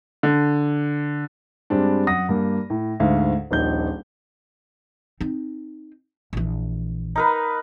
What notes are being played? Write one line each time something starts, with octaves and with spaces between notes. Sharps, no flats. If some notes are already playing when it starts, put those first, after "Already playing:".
D3
G2 G3 G#3 C4 D4
F#2 F#5 D#6 A#6
G2 A#3
A2
D2 G#2 F5
D#1 A#1 D#4 G6
C4 D#4
A#1 E3
D#4 A#4 B4